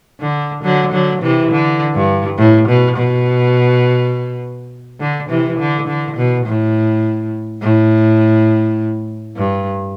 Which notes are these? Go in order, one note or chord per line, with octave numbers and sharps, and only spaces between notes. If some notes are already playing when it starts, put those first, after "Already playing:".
D3
D3 F#3
D3 F#3
C3 E3
D3
G2
A2
B2
B2
D3
C3 E3
D3
D3
B2
A2
A2
G2